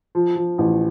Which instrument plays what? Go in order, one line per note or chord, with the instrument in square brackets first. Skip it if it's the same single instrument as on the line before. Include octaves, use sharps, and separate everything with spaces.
[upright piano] F3
F3
A1